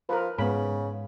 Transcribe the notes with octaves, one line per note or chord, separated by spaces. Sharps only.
F3 A#4 B4
G#2 C#3 B3 B5